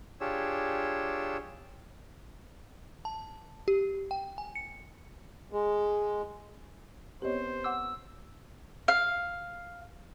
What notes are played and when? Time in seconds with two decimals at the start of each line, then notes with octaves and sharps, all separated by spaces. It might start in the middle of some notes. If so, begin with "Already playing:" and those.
0.21 D4 F4 G4 G#4 C#5 E6
3.05 A5
3.68 G4
4.11 G5
4.38 G#5
4.55 C#7
5.52 G#3
7.22 B3 C4 G4 C5 C#5 D#5
7.64 F#5 D6 E6
8.88 F5